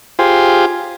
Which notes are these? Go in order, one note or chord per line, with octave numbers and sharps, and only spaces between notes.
F4 G4 G#4 C5